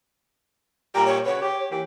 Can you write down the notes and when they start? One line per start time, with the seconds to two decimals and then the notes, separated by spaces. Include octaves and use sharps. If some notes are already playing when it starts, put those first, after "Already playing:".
0.95 A#2 G3 G4 A#5
1.07 C#5
1.26 C#3 F#4 B4 C#5
1.42 G4
1.71 E3 A#3 G4